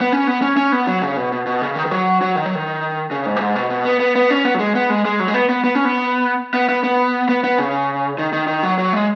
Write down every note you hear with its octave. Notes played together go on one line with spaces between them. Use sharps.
B3
C#4
B3
C#4
C#4
B3
F#3
C#3
B2
B2
B2
C#3
D#3
D#3
F#3
F#3
D#3
F#3
D#3
C#3
G#2
B2
G#2
B2
B2
B3
B3
B3
C#4
B3
F#3
G#3
B3
G#3
G#3
F#3
G#3
B3
B3
B3
C#4
B3
B3
B3
B3
B3
B3
C#3
D#3
D#3
D#3
F#3
F#3
G#3